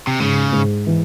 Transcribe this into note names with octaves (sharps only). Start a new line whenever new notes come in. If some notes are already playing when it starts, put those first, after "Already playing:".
C3
G#2 C#3
G#2
E3